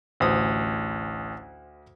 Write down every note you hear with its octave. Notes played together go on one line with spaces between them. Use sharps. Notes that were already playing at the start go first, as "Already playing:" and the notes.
A1 D2 C5 D#6